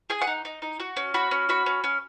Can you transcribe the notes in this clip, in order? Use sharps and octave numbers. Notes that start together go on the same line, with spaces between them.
G#4 G#5
F#5
D#4
D#4
D#4
F#4
C#4
F#4 B5
C#4
F#4 B5
C#4
C#4